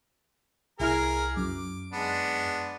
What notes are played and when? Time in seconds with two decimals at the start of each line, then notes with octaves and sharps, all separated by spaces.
0.79 C2 E4 G#4 A#4 A#5 F6
1.37 F#2 D6
1.92 G#3 B3 D4